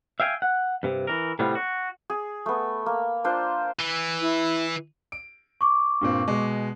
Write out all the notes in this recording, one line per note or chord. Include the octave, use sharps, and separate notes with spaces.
E5 F5 G5 G#5
F#5
G2 C3
E3 A#4
A2 C3 G3 B3 F4
F#4
G#4
A3 B3
A#3
D4 F4 C5
E3
E4
D7
C#6 D6
G2 A#2 C4
B2 G#3